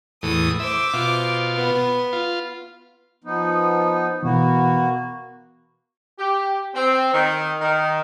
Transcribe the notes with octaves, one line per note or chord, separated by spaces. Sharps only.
E2 A2 D#6
C5 E5 D6
B2 F4
B3
F4
F3 B3 D#4
B2 E3 A#3 B3 F#4
G4
C4
D#3
D#3